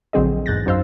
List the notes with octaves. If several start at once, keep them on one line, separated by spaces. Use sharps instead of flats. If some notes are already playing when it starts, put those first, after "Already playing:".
A#1 D3 F#3 C4 G#4 D#5
E2 G#2 F#6 G6 A6 A#6
F#2 D#4 C5 F5 E6